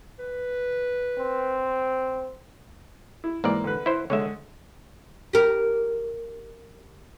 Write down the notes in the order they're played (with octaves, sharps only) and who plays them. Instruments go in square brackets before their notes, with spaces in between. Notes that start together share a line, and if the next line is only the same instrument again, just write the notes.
[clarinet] B4
[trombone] C4
[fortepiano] E4
[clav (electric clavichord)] G#2 E3 D5 [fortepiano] A#3
[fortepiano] D3 B4
[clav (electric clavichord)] E4 C5
[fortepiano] D3 G#3 [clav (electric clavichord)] C#5 E5
[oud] G4 A#4